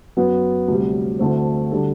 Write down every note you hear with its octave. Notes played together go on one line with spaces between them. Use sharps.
F#2 F#3 B3
D2 C3 G3
D2 D3 A3 C4
D3 G3 D4 A4